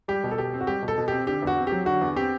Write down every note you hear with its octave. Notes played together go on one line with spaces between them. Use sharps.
G3 G4
B2
A4
B2 G4
C4
F#4
G3 G4
B2
A4
B2
C4 G4
D3 G4
E2 F#4
C4
F#3 G4
D3 F#4
E2
C4 G4